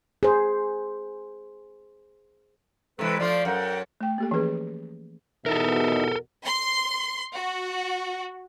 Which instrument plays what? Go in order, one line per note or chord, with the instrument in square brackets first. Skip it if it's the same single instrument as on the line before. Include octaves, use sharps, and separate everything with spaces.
[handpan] G#4 C5
[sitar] C3 E3 [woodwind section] G#3 A4 B4
[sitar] F3 A3 F4 [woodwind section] D5 C6
[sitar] F#2 [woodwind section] A#4 F#5 G5
[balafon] A3 G5
A#3 G4 A4
E3 F3 C#4 G#4 B4
[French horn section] E2 B2 [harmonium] D#4 E5 [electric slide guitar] A4 A#4
[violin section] C6
F#4